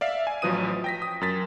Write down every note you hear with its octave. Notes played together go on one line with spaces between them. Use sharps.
D5 E5 F5
G#5
A1 F3 F#3 B4 D#6 D#7
G5 A#6 B6
D#6
F#2 A#4 A6 B6